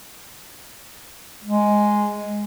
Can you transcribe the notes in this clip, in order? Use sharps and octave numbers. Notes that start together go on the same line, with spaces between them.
G#3